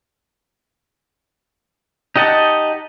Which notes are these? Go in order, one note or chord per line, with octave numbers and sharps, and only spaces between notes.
D#4 G4 D#5 F#5 A5